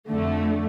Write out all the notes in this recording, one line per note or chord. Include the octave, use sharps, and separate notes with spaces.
F2 D3 A3